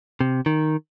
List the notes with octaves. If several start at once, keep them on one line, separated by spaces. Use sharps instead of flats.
C3
D#3